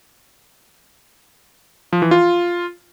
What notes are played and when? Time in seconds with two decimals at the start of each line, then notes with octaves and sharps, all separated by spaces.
1.93 F3
2.02 E3
2.11 F4